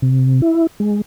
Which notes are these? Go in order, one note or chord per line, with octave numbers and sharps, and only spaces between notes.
C3
E4
G#3